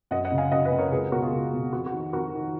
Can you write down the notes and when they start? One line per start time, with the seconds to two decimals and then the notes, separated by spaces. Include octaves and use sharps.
0.11 F#2 D#5 F#5
0.25 D#5 F#5
0.32 C#3
0.38 F5 G#5
0.52 F#2 D#5 F#5
0.65 B4 D#5
0.72 C#3
0.78 A#4 C#5
0.92 C#2 G#4 B4
1.12 B2 F#4 A#4
1.22 F4 G#4
1.32 C#2
1.53 B2
1.73 F2 F#4
1.86 F#4
1.93 D#3
2.13 F2 F#4 A#4
2.33 D#3